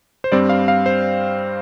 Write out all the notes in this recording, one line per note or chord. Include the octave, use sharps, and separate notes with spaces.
C5
G2 G3 C4 D5
F5
F5
C5